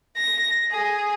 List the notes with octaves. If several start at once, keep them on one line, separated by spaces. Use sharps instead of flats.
A#6
G#4